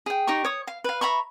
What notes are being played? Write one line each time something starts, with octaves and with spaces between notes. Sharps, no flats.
G#4 G5
D#4 G4 A#5 C#6
C#5 D#6
F5
B4 F5
E5 A#5 B5 C#6